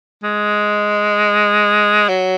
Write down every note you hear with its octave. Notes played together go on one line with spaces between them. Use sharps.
G#3
F#3